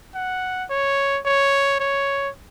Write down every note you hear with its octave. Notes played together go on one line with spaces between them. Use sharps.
F#5
C#5
C#5
C#5